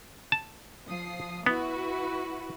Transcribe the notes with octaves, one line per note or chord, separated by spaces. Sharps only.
A5
F3 D#6 C7
B3 E4 F#4 B4